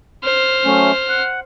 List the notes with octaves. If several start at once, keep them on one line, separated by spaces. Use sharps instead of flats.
C5 F6
F#3 A3 C#4
F#5